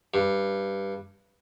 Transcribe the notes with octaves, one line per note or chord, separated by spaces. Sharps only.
G2